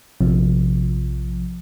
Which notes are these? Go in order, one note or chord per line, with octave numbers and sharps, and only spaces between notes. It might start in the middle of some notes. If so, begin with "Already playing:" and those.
A#1 C3 F3